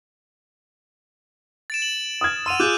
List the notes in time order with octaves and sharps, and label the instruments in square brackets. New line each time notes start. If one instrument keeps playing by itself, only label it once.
[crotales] A6 D7 E7
F#7
[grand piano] D#6 F6 G#6
[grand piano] F#5 C6 [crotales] E6 D#7 F7
[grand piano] F4 G#4 [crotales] D6 F#6 G6